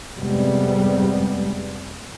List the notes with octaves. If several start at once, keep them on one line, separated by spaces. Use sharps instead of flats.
F2 G#2 C3 G3 G#3 B3